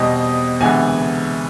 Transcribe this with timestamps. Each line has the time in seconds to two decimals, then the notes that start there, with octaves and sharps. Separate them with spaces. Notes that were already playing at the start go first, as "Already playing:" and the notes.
Already playing: E2 B2 G3 C4 D#5
0.60 D2 C3 E3 G#3 B3 G#5